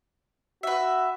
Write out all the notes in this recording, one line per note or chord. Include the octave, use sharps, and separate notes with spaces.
F#4 B4 E5